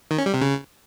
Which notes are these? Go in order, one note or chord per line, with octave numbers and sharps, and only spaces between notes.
D#3
C#4
G3
C3
C#3